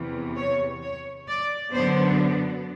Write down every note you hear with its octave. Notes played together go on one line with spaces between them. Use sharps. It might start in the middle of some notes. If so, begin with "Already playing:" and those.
Already playing: E2 C3 E3
C#5
C#5
D5
F#2 D3 F#3 B3 D4 C5